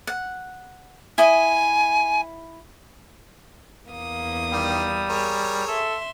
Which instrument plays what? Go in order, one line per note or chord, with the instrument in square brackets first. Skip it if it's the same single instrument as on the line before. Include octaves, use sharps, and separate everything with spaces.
[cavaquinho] F#5
[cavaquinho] E4 D#5 [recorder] G#5
[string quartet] E2 A#3 D#6
[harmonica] D#3 G4 [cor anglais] G3
[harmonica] G#4 A#4 C#5
[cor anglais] A4 [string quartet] E5 C6